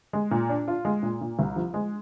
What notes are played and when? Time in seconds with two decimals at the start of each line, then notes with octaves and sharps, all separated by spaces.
0.13 G#3
0.31 A#2
0.49 D4
0.68 F4
0.85 G#3
1.03 A#2
1.21 A#2
1.39 C2
1.56 F3
1.74 G#3